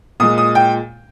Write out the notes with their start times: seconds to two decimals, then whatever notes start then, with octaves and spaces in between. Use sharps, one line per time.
0.20 A#2 G#3 D#6
0.38 D#6
0.55 G5